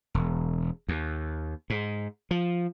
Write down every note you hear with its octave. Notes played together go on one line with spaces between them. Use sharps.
E1
D#2
G#2
F3